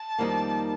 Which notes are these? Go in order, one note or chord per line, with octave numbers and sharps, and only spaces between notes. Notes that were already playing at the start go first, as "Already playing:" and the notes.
Already playing: A5
F2 D#3 G3 A#3 D#4